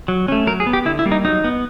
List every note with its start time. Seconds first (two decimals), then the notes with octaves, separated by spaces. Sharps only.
0.08 F#3
0.28 A3 C#4
0.47 F#3 A#4
0.60 G#4
0.67 B3
0.73 G4
0.85 D3 E4
0.99 E4
1.06 G3 A#3
1.12 D#4
1.25 F#3 D#4
1.44 B3